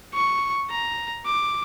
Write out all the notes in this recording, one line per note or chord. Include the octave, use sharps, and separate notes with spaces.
C#6
A#5
D6